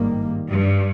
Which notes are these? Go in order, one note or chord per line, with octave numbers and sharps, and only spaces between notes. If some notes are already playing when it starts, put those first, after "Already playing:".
Already playing: G#1 G2 D#3 G3 A#3
G2